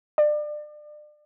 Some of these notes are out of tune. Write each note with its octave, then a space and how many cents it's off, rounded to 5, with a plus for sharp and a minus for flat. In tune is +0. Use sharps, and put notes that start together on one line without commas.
D5 +30